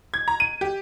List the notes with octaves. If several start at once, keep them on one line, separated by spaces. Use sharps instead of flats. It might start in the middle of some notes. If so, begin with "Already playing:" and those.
G#6
A#5
D#7
G4